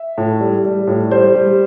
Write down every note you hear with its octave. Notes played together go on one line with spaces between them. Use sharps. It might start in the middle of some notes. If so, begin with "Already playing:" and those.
Already playing: E5
A2
G3
G3
A2
G3 C5
G3